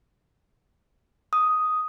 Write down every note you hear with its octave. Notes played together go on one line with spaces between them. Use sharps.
D#6